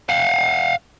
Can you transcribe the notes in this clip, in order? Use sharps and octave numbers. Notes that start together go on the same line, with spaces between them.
F5 F#5